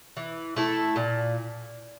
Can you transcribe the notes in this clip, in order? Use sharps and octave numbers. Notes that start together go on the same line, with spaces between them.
E3
A3 E4 A4
A#2